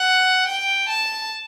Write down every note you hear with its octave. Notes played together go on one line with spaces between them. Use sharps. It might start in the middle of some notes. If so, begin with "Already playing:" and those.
Already playing: F#5
G5
A5